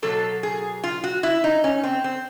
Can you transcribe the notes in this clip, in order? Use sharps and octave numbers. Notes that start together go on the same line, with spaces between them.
B2 F#3 A#3 A4
G#4
F4
F#4
E4
D#4
C#4
C4
C4